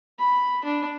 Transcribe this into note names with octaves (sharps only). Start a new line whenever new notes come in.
B5
D4